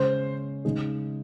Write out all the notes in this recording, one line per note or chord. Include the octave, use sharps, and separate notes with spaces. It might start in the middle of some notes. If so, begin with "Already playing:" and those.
Already playing: C#3 G#3 C#4 G#4 C5
C#3 G#3 D#4 G#4